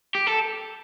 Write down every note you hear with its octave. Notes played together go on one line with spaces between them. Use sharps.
G4
A4